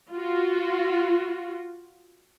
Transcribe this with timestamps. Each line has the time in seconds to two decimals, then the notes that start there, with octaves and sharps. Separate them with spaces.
0.12 F4 F#4